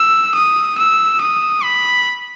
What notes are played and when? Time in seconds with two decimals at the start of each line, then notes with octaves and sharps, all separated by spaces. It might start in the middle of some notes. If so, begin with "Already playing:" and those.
Already playing: E6
0.35 D#6
0.78 E6
1.21 D#6
1.64 B5